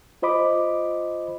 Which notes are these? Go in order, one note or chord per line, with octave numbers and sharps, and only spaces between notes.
F4 C5 D#5 B5 D6